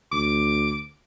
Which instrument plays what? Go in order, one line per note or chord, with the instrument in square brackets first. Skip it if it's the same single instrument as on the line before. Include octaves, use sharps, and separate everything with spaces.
[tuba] D2 [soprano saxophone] D6